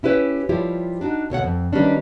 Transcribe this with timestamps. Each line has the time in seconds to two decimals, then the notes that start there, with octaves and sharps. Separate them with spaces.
0.03 C#4 E4 G4 B4 C#5
0.49 F3 G3 E4 F4 G4 C#5
1.01 D4 D#4 F#4
1.30 D2 B2 C#5 F#5
1.44 F2
1.73 D#3 G3 A#3 B3 C#4 D4